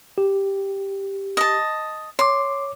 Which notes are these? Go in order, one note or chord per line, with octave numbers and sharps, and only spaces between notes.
G4
D#5 A5
C#5 C6 D6